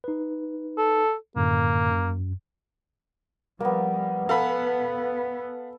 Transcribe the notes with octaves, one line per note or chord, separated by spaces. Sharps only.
D#4 B4
A4
F#2 A2 D3 A#3
F#2
F3 G3 A#3 B3
B3 A4 F5 F#5 G#5 B5